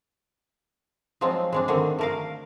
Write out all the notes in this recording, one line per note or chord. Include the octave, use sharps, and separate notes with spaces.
F3 F#3 G#3 C4 D#4 F4
G#3 C4 D4
D3 D#3 A3 C4
A3 A#4 F5